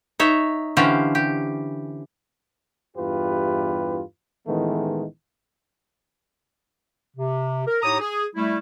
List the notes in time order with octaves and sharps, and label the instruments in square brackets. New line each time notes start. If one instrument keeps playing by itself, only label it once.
[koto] D#4 C#5 E5
D3 E3 C#4 G4 C5 F5
G4
[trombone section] E2 G2 E4 F4 G4 B4
A1 D#3 E3 G#3 A3 B3
[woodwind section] C3
A#4
A2 D#4 G4 C#5 A#5 D#6
G#4
G3 A3 E4